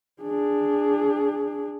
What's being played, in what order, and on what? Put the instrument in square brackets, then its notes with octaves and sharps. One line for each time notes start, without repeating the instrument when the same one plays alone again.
[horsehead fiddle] D4 G#4